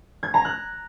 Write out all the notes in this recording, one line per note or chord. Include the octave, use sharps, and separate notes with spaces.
G#6
A#5
F#6